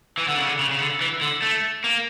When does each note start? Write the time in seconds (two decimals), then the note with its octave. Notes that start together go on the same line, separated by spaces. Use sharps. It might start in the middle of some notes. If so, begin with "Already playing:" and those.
0.17 E3
0.28 D3
0.37 C#3
0.47 D3
0.59 C#3
0.71 C#3
0.80 D3
1.01 E3
1.21 D3
1.42 A3
1.84 A#3